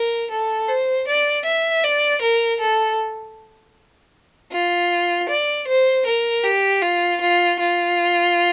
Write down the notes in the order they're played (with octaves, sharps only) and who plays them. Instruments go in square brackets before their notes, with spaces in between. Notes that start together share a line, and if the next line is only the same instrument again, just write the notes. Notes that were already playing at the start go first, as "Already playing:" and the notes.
Already playing: [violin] A#4
A4
C5
D5
E5
D5
A#4
A4
F4
D5
C5
A#4
G4
F4
F4
F4